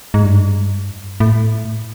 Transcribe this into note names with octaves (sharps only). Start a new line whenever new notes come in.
G#2
G2
A2